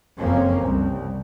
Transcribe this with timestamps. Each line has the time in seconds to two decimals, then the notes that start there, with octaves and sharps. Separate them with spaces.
0.19 F#1 F2 F3 A#3 C4 C#4
0.59 C2